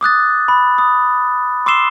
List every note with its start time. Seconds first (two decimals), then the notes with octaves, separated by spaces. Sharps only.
0.01 D6 D#6 F#6 A6
0.48 B5
0.78 D#6
1.66 C6 D6 E6 C7 E7 G7